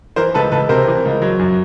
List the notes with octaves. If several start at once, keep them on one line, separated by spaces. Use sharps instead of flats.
E3 A#4 C5
C#2 A4 B4
C#2 A4 B4
C3 A#4 C5
E3
C#2
F#3
F#2